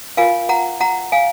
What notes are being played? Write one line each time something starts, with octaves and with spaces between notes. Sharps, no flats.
F4 A#4 F5 G#5
F#5 A#5
F#5 A#5
F5 G#5